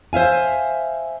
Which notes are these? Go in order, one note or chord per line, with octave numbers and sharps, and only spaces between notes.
C5 E5 F5 G#5